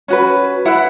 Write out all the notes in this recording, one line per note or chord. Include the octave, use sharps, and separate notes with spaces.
C#4 F#4 B4
E4 B4 F#5